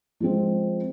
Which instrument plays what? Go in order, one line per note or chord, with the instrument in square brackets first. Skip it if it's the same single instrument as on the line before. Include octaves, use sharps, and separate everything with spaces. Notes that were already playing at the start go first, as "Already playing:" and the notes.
[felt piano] F3 G#3 C4